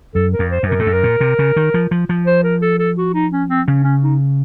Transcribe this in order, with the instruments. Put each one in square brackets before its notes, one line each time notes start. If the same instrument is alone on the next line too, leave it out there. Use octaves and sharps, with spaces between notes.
[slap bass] F#2 [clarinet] A4
[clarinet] A#4
[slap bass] F2
[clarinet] C5
[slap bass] F#2
[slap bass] A#2 [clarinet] A#4
[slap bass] A2 [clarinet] A4
[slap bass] F#2
[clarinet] A#4
[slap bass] A#2
C3
C#3
D#3
F3
F3
F3
[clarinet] C5
A#4
A4
A4
F#4
D#4
C#4
C4
[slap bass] C#3 [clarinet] C#4
[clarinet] C#4
D#4